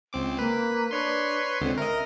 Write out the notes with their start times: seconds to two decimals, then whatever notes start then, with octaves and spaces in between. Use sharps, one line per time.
0.13 C#2 C4 D6
0.39 A#3 B4
0.91 D4 B4 C#5 C6
1.61 C#2 D3 C4
1.78 A#4 D#5 E5